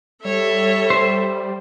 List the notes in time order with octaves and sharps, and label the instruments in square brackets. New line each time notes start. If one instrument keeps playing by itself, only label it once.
[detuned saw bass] G3 [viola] A4 E5 [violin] C#5
[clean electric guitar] C5